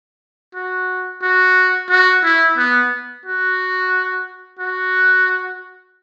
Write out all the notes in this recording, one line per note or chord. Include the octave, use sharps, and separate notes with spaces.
F#4
F#4
F#4
E4
B3
F#4
F#4